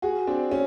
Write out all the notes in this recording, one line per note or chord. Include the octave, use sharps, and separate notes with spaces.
F#4 G#4
C4 D4
C#4